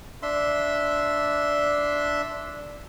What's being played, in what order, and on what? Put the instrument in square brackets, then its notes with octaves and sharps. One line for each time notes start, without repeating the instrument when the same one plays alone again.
[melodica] D4 E5 C6